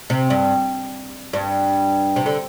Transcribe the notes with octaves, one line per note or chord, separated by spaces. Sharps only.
C3
G2
G2
C3
D3